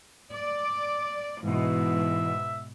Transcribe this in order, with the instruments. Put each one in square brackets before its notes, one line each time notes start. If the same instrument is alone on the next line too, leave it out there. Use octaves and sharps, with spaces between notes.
[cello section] D5 [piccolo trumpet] D6
[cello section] G#2 B2 [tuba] E3 [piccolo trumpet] E5